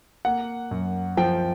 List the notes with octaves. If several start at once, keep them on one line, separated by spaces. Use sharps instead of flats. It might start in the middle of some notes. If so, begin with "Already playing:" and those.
A#3 F#5
F#2
F3 G5